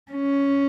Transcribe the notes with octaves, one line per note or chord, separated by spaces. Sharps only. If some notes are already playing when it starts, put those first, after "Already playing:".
C#4